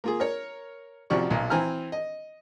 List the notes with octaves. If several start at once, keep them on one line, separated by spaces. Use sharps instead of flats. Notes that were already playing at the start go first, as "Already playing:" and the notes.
A#3 F4 G#4
A#4 C#5
A1 C3 F3 F#4 D5 C#6
B1 A#2
E3 C4 G#5 A#5 F6
D#5